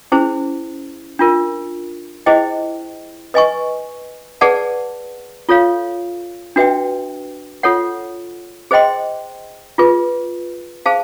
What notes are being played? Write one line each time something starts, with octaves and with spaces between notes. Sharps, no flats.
C#4 E4 G#4 C5
D4 F4 A#4
E4 G#4 C5 D#5 G5
B4 D#5 G#5 C#6
G#4 B4 D5 F#5 A5
F4 A4 C#5 F5
D4 F#4 B4 E5 G5
F4 A4 C#5 F#5
G#4 C5 D#5 G5 C6
F4 G#4 B4
G#4 C5 F5 A5